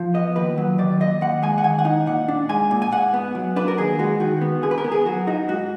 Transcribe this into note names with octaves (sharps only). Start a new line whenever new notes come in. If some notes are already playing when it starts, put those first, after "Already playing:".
Already playing: F3
B3 D#5
D#2 B4
F#3
D#3 D5
D#2 D#5
D#2 F#5
G#3 G#5
F#5
D#3 G#5
F#5
D#4
A#2 F#5
D4
G#3 G#5
A#2
G#5
G#2 F#5
B3
F#3
D4 B4
A#4
D#2 G#4
G#3 F#4
D#3 F#4
B3
D3 G#4
B4
A#4
B3
G#4
F#3 F#4
D#4 F#4
G#2 F#4